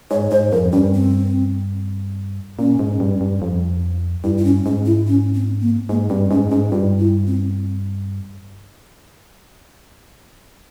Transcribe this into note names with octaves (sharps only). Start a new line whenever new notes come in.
G#2 C#5
G#2 C5
F2 A#4
G2 C#4
C4
A#2 C#4
G#2
G2
G2
F2
G2 E4
E4
C#4
G#2 C#4
E4
C#4
C4
A#3
G#2 A#3
G2 C4
G#2 C#4
G#2 C#4
G2 F4
E4
C4